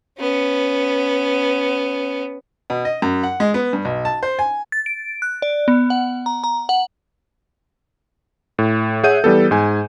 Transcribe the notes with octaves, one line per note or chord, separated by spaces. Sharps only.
B3 C#4
B2
D#5
F#2
F#5
G#3
B3
G2
B1
A5
C5
G#5
A6
D7
F#6
D5
B3
F#5
A#5
A#5
F#5
A2
G#4 C#5 E5 F#5 G6 D#7
E3 G3 B3 A4
G#2 G#5